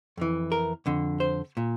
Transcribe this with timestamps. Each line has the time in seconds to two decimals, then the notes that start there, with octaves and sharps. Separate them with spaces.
0.17 F2 E3
0.52 A#4
0.86 F2 D3
1.20 C5
1.57 A#2